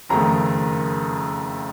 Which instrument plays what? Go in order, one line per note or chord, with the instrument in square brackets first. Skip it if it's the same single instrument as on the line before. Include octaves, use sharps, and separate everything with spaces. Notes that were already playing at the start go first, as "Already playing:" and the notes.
[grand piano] F#1 F2 D#3 A3 A#5